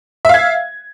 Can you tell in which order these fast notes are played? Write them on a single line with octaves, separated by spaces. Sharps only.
E5 F5 G#6